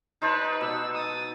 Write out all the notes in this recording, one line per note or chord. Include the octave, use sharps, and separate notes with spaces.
D#4 B4 C5 D5 A5
B2 E6
D#6 A6